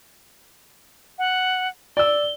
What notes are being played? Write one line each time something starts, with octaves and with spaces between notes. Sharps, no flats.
F#5
D5 E6 G7